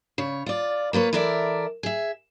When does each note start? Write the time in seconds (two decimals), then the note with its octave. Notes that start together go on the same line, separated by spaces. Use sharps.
0.18 C#3 C#5
0.46 F4 D5
0.93 A#3 F4 B4 C#5
1.13 E3 A4 A#4 D5 E5
1.83 G#4 E5